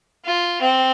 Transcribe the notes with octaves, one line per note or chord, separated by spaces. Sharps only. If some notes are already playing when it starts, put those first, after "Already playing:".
F4
C4